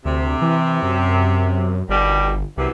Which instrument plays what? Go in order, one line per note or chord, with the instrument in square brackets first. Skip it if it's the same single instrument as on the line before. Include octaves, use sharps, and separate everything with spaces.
[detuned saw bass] D2 [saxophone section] C3
[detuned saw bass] E3
F#2
[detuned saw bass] G1 [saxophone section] B2 D#3 G3
[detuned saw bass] C2 [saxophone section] F#2 C3 E3